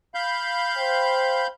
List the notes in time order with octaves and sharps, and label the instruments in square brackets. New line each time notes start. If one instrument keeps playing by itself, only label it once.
[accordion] F5 B5 G6
[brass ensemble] C5 G5